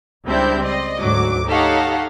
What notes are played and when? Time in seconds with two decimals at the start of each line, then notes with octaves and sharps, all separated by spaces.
0.26 C#2 G3 C4 D4 E4 G6
0.64 D5 D#5 C6
0.99 D2 G#2 F#3 D6
1.47 D#4 G4 A4 C#5 F5 F#5